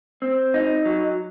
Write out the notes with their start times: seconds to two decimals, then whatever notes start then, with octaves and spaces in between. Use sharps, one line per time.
0.22 C4
0.54 D#4
0.85 F#3